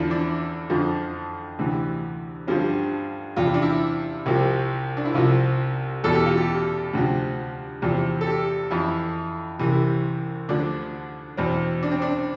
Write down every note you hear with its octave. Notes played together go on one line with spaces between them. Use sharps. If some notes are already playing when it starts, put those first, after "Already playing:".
Already playing: E2 D3 F3 E4
D4
F2 D3 F3
D2 C3 E3
G2 D3 F3 C4
E2 C3 F3 F4
E4
D4
E4
C2 C3 F3
D4
E4
C2 C3 F3 F4
E2 B2 A4
G4
F4
G4
D2 C3 F3
E2 C3 F3
A4
G4
F2 E3 E4
C2 C3 E3
D2 D3 F3 D4
E2 B2 C4
D4
C4
D4